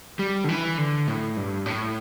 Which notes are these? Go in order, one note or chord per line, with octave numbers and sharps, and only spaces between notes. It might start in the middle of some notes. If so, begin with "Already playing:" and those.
G3
D3
E3
D3
A2
G2
A2